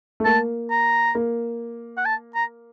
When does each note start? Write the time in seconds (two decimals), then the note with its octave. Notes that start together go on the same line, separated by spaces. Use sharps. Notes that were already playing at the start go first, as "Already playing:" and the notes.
0.20 A3
0.25 A#3 A5
0.71 A#5
1.15 A#3
1.97 F#5
2.06 A5
2.35 A#5